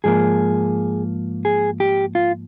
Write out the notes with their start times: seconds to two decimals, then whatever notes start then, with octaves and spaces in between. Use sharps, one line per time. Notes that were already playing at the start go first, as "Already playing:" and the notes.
0.04 G#2 F3 A#3 G#4
1.45 G#4
1.80 G4
2.15 F4